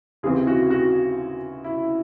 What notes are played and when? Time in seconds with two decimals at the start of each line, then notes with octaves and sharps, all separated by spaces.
0.23 D#2 C#3 E3 C4 G#4
0.47 F#4
0.71 F#4
1.64 E4